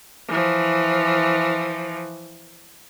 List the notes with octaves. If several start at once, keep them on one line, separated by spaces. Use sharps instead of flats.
E3 F3